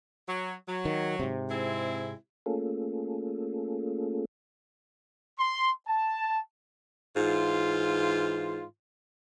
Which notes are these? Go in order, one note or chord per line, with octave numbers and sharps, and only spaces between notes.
F#3
F#3
D#3
G#2 C3
G#3 C4 E4
A3 A#3 C#4 F4 G#4 A4
C6
A5
G#2 E3 F4